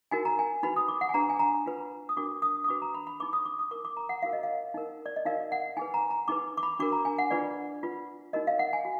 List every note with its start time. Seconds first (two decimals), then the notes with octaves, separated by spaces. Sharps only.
0.11 D#4 F#4 A#4 G#5
0.25 A#5
0.39 G#5
0.63 D#4 F#4 B4 B5
0.76 D#6
0.88 D6
1.01 F#5
1.09 G#5
1.14 D4 G#4 B4 A#5
1.29 G#5
1.39 A#5
1.66 F4 B4
2.09 D#6
2.17 D4 F#4 A#4 D6
2.42 D#6
2.64 D#6
2.68 D4 F#4 B4 D6
2.82 A#5
2.94 B5
3.07 B5
3.20 D#4 G#4 B4 D6
3.33 D#6
3.45 D6
3.59 D#6
3.71 D#4 A#4 D6
3.85 D6
3.97 A#5
4.09 F#5
4.22 D#4 F#4 A#4 F5
4.33 D#5
4.43 F5
4.74 D#4 A#4
5.06 D5
5.16 D#5
5.26 D#4 F#4 A#4 F5
5.52 F#5
5.77 D#4 G#4 B4 G#5
5.94 A#5
6.11 A#5
6.28 D#4 G#4 B4 D6
6.57 D6
6.63 B5
6.79 D4 F#4 A#4 D6
6.92 A#5
7.05 G#5
7.18 F#5
7.30 D4 F4 G#4 B4 D5
7.83 F4 B4
8.33 D#4 F#4 A#4 D#5
8.47 F5
8.59 F#5
8.73 G#5
8.85 F#4